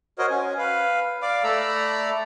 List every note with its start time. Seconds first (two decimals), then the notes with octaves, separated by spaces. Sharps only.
0.18 F#4 A#4 C5 C#5 D#5
0.30 C#4 G#5
0.58 B4 F5
1.22 D5 F5 D6
1.44 A3 A4 D5 A#5 B5 E6